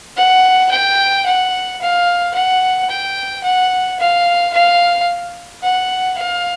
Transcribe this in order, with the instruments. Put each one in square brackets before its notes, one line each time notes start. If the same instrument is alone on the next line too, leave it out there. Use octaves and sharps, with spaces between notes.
[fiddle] F#5
G5
F#5
F5
F#5
G5
F#5
F5
F5
F#5
F5